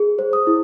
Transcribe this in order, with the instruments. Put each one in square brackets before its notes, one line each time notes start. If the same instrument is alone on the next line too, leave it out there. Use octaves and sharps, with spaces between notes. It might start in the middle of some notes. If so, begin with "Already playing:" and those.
Already playing: [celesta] G#4
C5
D#6
E4